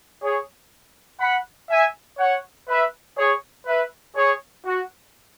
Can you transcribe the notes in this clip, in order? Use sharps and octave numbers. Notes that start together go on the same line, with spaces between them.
G#4 C#5
F#5 B5
E5 G#5
C#5 F#5
B4 E5
G#4 C#5
B4 E5
G#4 C#5
F#4